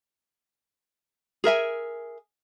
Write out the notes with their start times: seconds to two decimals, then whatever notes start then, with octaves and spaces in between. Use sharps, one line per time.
1.44 G#4 A#4 E5 G#5